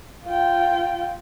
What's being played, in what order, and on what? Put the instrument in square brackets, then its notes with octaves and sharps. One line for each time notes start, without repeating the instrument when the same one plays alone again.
[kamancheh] F4 G5